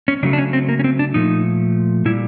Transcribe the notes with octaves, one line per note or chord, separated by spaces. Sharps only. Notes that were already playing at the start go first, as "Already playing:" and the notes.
C#4
C#3 F#3 A3 D4
D4
C#4
C4
A#3
C#4
C4
D4
A#2 F3 A3 D#4
A#2 G3 E4